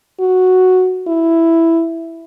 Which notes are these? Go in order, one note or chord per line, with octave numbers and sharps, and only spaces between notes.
F#4
E4